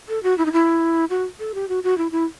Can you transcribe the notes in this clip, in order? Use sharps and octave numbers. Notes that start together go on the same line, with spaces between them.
A4
F#4
E4
D#4
E4
F#4
A4
G4
F#4
F#4
E4
E4